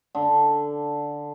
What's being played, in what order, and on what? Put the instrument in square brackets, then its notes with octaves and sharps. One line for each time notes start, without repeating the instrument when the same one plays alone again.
[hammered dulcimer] D3